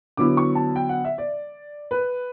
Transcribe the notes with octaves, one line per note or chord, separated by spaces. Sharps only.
D3 F#3 B3 E4 D6
C#6
A5
G5
F#5
E5
D5
B4